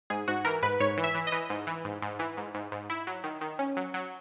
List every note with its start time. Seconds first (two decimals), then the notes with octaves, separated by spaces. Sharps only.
0.10 G#2 G#4
0.28 G#2 F#4
0.45 E3 A#4
0.62 G#2 B4
0.80 G#2 C#5
0.97 E3
1.04 E5
1.15 E3
1.27 D#5
1.32 E3
1.50 G#2
1.67 E3
1.85 G#2
2.02 G#2
2.19 E3
2.37 G#2
2.54 G#2
2.72 G#2
2.90 E4
3.07 F#3
3.24 D#3
3.41 D#3
3.59 C#4
3.77 F#3
3.94 F#3